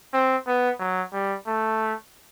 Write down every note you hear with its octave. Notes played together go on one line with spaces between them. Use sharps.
C4
B3
F#3
G3
A3